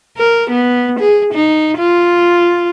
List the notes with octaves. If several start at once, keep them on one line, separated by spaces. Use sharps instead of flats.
A#4
B3
G#4
D#4
F4